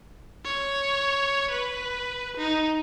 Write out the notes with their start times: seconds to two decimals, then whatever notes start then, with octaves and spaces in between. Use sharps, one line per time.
0.45 C#5
1.51 B4
2.37 D#4